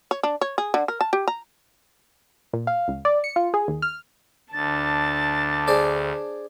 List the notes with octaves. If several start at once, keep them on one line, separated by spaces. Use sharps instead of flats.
C#5
D4
C#5
G#4
D3
A#4
A5
G4
A#5
A#2
F5
C#2
D5
C#7
F4
G#4
D#2
F6
D2 D4 A5 A6
G#4 C5 D5